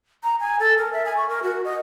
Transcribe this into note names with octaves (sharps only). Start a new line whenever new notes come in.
A#5
G#5
A4
A#4
E5
G#5
C#6
A#4
F#4
D#5